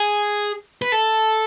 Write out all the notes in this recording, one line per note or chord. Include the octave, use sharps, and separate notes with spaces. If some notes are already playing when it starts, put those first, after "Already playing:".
Already playing: G#4
B4
A4